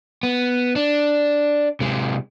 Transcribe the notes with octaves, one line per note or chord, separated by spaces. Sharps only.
B3
D4
C3 G#3